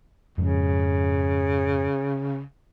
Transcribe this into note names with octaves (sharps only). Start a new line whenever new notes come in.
F2 G#2 C#3